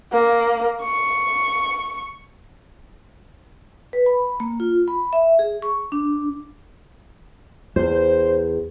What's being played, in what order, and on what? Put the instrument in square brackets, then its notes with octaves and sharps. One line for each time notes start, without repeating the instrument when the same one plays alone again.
[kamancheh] A#3
C#6
[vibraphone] B4
B5
A#3
F4
B5
E5
G#4
C#6
D4
[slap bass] E2 [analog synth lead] C5